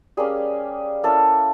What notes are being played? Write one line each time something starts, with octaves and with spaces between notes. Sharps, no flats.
G3 A#3 C#4 G#4
A#3 C#4 E4 A4